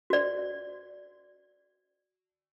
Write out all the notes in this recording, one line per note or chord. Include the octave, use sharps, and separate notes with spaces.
F#4 D5